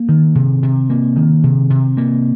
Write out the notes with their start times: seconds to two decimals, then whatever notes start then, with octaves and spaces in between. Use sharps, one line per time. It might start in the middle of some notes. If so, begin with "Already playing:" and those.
Already playing: A#3
0.09 D#3
0.35 C3
0.63 C3
0.90 A#3
1.16 D#3
1.44 C3
1.70 C3
1.97 A#3